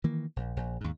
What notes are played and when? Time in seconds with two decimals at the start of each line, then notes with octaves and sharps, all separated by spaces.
0.04 D#3 E3 A#3
0.36 A#1
0.57 A#1
0.81 D#2 G#2